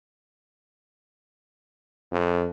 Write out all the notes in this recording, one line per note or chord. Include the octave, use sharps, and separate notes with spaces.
F2